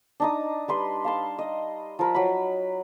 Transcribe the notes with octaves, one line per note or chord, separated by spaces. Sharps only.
D4 D#4 D#6
G3 B4 C6
F5 A5 C6
D#5
F3 A#4 B5
F#3 B5